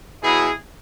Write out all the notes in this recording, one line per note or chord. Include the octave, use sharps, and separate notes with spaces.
B2 F#3 E4 G#4